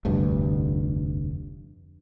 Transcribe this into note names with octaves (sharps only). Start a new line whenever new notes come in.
F1 D2 G2